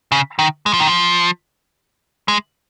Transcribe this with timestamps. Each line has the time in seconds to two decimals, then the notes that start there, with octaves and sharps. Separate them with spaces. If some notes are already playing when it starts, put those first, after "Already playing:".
0.12 C#3
0.39 D#3
0.66 G#3
0.73 F3
0.80 D#3
0.87 F3
2.28 G#3